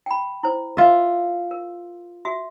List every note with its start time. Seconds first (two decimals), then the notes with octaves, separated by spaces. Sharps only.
0.06 G5 B5
0.43 E4 C5
0.77 F4 E5
1.51 A#4
2.25 F#4 E5